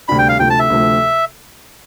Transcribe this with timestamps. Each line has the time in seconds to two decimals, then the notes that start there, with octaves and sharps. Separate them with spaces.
0.08 D2 C3 G3 D4 B5
0.18 G5
0.28 F5
0.39 D2 C3 F3 A3 G5
0.50 A5
0.59 E5
0.70 D2 C3 F3 A3